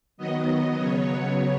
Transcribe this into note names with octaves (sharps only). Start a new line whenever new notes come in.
D#3 F#3 B3 D#5
C#3 F#3 B3 C#5